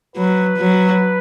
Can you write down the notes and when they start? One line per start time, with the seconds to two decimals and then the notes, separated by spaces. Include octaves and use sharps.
0.16 F#3 B4
0.58 F#3